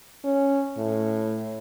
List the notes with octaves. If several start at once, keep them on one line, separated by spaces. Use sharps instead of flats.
C#4
A2